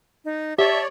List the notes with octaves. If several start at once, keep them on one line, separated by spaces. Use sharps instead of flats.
D#4
G4 C#5 D5 E5 A5